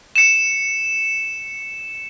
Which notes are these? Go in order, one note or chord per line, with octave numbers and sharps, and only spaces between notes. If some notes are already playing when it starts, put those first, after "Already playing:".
C#7 E7